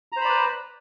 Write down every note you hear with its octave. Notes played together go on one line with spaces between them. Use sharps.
B4 C5 D5 A#5 B5